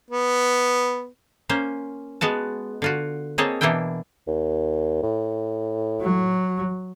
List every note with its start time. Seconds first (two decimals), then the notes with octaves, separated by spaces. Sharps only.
0.11 B3
1.49 A#3 C#4 C5
2.21 G#3 B3 F#4 A5
2.82 D3 F4 F#4
3.38 A#3 C4 G#4 C#5 D#5 A5
3.61 B2 E3 A#3 D4 E4 G5
4.27 D#2
5.03 A2
6.01 F#3